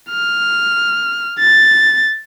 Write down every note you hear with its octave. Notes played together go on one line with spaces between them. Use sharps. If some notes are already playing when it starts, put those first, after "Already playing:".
F6
A6